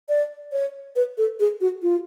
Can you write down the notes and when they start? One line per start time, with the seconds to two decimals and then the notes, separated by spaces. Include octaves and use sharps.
0.09 D5
0.52 C#5
0.96 B4
1.18 A4
1.40 G#4
1.61 F#4
1.82 F4